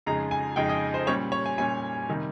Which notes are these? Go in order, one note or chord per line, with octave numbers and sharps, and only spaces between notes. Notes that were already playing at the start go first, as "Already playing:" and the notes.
F2 C#3 G#3 D#4 A#5
G#5
F2 C#3 G#3 D#4 G5
D#5
C5
A#2 G3 C#4 C#5
C#5
G#5
A#2 G3 C#4 G#5
C3 D#3 G3